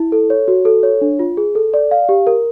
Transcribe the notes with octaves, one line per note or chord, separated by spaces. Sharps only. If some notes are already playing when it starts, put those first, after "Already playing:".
Already playing: E4
A4
C#5
F#4
A4
C#5
D4
F4
G#4
A4
D5
F5
G4
A#4